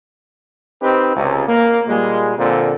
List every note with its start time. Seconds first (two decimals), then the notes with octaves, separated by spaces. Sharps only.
0.82 C4 D#4 G4 B4
1.15 C#2 C3
1.48 A#3
1.88 A#2 G3 G#3
2.39 A#2 D3 F3 C4